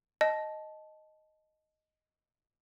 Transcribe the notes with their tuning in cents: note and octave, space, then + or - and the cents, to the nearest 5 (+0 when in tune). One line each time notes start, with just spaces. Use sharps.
D#5 +0 A5 -15